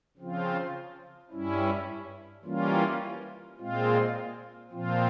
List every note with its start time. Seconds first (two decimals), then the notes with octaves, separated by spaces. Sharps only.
0.17 C#3 F3 C4 F4
1.31 G2 G3 C#4 E4
2.44 E3 G3 A#3 C#4 F4
3.58 A#2 G#3 C4 F4
4.71 A#2 F3 C4 F4